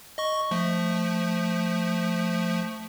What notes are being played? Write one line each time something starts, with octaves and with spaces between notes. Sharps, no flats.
D#5 C#6
F3 A3